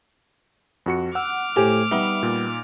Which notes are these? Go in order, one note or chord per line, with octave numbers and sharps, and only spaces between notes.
F2 F#4 C#7
F#5 D6 E6 F6
A2 G4 C5 G#5
G3 B3 D#4 E5
A#2